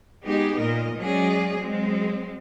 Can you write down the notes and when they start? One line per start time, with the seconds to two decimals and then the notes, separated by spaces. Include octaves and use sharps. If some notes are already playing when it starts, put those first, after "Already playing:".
0.26 G#3 B3 D#4 G4 G#4
0.61 A#2 A#4 D#5
0.99 F#3 G#3 C#4 G#4 D5 D#5
1.60 F#3 G#3 C4